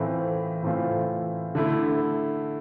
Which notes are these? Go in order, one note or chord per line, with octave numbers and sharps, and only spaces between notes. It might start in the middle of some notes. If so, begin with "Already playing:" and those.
Already playing: A2 E3 A3 C4 F4
A2 E3 A3 C4 F4
D3 A3 E4